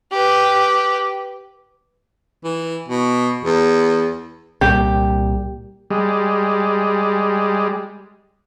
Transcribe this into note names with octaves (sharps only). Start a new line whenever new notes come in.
G4 B4
E3
B2
E2
C2 A#2 G3 G4
G3 G#3